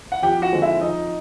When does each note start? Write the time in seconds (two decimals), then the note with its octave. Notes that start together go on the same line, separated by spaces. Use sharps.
0.12 F#5
0.22 F2 G4 G5
0.42 F#4 F#5
0.52 D3 F3 G#3 C4
0.62 E4 E5
0.81 F2 D#4 D#5